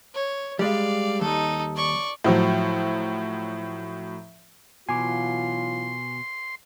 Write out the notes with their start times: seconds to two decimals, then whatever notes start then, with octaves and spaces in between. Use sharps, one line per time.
0.15 C#5
0.59 G3 G#3 D5 F5
1.21 D#2 G3 D#4 A4
1.76 D5 C#6
2.24 A2 F3 F#3
4.89 B2 E3 F#3 F4 G#5 C6 D6